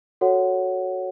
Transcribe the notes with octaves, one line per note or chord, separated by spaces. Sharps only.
F#4 A4 C#5 F#5